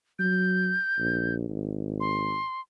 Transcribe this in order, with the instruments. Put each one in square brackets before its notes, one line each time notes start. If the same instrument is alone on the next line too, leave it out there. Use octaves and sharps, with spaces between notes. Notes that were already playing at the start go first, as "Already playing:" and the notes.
[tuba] F#3 [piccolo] G6
[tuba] A#1
G#1
[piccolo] C6